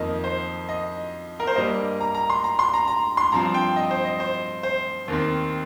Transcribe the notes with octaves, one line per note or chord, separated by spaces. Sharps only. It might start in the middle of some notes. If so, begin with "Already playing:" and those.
Already playing: F2 D#3 A#3 D#5
C5
D#5
A#4
C5
G2 G3 A#3 D#5
A#5
A#5
C6
A#5
C6
A#5
A#5
C6
G2 F3 C4 A#5
G5
D#5
C5
D#5
C5
C5
D#2 D#3 C4